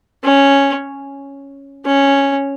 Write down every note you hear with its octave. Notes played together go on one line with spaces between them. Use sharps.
C#4
C#4